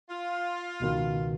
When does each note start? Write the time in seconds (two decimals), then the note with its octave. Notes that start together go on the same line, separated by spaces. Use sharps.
0.09 F4
0.80 C#2 B2 D#3